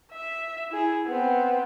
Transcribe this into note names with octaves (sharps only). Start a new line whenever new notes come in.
E5
E4 G#4
B3 C4